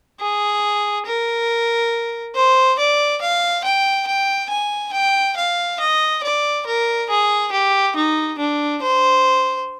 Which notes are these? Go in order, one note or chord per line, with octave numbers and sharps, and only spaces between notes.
G#4
A#4
C5
D5
F5
G5
G5
G#5
G5
F5
D#5
D5
A#4
G#4
G4
D#4
D4
C5